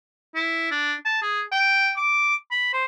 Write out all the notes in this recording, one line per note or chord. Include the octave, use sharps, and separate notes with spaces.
E4
D4
A5
G#4
G5
D6
B5
C5